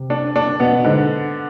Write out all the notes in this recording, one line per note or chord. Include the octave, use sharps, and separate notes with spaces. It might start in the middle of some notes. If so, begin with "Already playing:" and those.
Already playing: C3
D4
D4
B2 B3
B2
G#2 D3